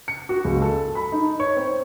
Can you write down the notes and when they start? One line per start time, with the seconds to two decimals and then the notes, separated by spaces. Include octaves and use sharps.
0.08 C#7
0.29 F#4
0.45 C#2
0.62 A4
0.95 B5
1.12 D#4
1.40 C#5
1.57 C4